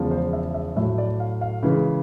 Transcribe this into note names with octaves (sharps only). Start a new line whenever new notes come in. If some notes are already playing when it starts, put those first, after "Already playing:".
Already playing: E2 C#3 F3 G#3
C5
E5
E5
A2 F#3 A3 E5
D5
F5
F5
C#3 E3 G#3